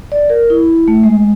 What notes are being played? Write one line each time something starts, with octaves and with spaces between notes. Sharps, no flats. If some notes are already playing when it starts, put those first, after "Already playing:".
D5
A#4
E4
A3
G#3